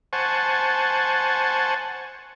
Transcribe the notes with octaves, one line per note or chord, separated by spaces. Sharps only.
C5 F#5 G#5 A5 C#6